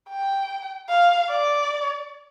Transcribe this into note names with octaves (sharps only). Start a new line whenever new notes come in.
G5
F5
D5